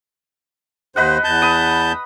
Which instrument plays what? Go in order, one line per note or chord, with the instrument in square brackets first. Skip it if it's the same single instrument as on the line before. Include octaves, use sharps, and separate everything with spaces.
[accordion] D#2 C5 [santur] B4 D#5 F#5
[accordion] E2 A5 G6
[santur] B5 D#6